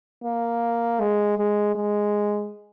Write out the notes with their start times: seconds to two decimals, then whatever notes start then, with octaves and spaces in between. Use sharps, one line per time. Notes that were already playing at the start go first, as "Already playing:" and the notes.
0.24 A#3
1.00 G#3
1.38 G#3
1.75 G#3